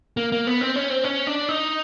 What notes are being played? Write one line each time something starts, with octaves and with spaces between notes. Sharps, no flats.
A#3
A#3
B3
C4
C#4
C4
C#4
D4
D#4